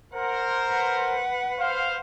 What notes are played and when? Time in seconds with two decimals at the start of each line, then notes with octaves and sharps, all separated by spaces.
0.14 A#4 C5 F#5
0.68 B4 F#5
1.59 C5 F5